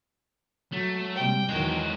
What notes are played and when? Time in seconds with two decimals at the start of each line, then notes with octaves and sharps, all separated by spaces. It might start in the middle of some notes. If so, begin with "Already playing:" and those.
0.72 F#3 A3
1.15 C3 G3 G5
1.49 E2 D#3 F#3 G#3 F#4